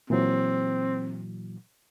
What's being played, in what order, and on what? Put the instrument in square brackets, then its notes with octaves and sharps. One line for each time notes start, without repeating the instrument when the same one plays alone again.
[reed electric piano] A#2 E3 F#3 [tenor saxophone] C4